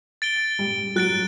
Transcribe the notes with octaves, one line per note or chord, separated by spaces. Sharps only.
A6 D7 G7
G3
F#3 F#6 A6 D7